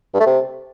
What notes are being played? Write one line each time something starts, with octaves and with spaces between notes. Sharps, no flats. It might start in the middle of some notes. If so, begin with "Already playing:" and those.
G2
A3
C3